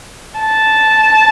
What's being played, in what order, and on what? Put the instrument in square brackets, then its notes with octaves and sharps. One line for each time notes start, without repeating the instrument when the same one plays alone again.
[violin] A5